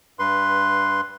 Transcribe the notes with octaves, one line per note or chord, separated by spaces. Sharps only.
G2 B4 C6